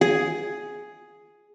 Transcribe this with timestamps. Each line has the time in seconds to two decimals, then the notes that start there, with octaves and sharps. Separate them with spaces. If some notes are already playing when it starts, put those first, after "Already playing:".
0.01 G#4